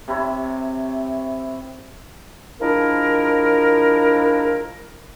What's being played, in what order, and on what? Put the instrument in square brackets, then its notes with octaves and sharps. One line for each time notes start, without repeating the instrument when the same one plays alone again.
[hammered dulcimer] C3 E4 C#5
[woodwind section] F3 G#3 D4 E4 A#4